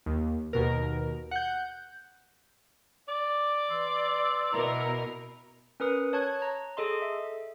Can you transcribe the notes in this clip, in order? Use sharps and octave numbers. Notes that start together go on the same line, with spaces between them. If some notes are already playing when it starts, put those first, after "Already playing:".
D#2
D#2 B2 A#4
F#5 G6
D5 D6
E3 C6 E6
B2 E4 A#4 A#5
C#4 A#4 B4 D#6
C#5 A5 C#6 F#6 G#6
A#5
G#4 A4 D#5 C6
E5